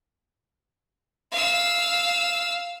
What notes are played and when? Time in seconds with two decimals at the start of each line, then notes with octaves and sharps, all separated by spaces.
1.32 F5 E6